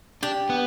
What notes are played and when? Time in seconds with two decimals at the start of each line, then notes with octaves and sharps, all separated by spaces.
0.23 D4 G4
0.49 B3